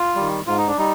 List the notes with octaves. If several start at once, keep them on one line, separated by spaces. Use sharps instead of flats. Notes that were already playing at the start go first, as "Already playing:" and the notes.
Already playing: F4
D#3 G3
G#2 F4
D#4
D4
G3 D#4